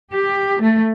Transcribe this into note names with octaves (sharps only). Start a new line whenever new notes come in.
G4
A3